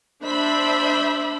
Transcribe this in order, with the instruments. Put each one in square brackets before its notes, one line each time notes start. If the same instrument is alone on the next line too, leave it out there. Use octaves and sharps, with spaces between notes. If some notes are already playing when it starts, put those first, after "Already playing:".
[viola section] D4 C5 E5 B5